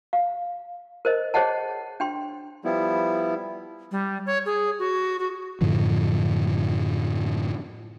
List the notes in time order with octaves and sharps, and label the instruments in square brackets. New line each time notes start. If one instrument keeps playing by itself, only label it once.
[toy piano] F5
A#4 C5 D#5
G#4 C5 C#5 D#5 F#5 A5
D4 G5 C6
[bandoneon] F3 G3 B3 E4
[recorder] G3
C#5
G#4
F#4
F#4
[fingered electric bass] F#2 A2 D3 F3